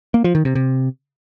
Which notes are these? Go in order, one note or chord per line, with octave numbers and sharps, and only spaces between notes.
A#3
F3
D#3
C3
C3